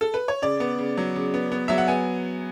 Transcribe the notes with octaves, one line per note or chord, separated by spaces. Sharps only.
A4
B4
C#5
C#3 D5
B3
C#3
F#3
C#3
B3
B3
F#3 E5
F#5
B3 G#5